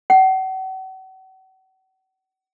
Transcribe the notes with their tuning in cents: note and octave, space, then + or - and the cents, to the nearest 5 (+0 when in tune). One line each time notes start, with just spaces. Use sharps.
F#5 +40